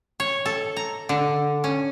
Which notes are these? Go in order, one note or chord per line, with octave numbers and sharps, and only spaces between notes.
C#5
A4
A#5
D3
C#4